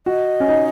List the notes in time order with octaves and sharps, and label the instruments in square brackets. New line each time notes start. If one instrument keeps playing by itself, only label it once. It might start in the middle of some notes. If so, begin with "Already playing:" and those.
[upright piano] F#4 [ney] D#5
[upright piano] C#4
D#4